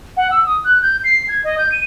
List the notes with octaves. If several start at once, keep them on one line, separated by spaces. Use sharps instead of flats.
F#5
E6
D#6
F#6
G6
C7
G#6
D#5
G6
D#7